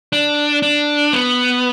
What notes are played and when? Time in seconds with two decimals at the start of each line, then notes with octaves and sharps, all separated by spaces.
0.12 D4
0.62 D4
1.13 B3